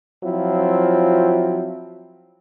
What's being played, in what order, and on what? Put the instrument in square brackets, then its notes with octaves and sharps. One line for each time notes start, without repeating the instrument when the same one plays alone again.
[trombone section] F3 F#3 C4 E4 F4